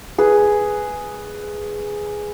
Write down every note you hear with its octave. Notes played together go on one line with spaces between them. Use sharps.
G#4 B4